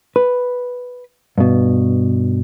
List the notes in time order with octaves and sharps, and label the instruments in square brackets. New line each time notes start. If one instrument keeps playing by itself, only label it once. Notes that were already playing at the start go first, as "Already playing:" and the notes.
[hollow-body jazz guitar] B4
G2 B2